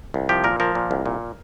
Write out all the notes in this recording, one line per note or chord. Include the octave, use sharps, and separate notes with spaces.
C2
F3 G4
A#2 A#4
F3 A#4
A#2
C2
A#2